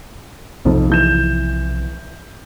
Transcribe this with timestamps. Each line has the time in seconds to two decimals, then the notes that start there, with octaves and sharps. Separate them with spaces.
0.65 B1 F2 C3 F3 D#4
0.90 E3 G6 E7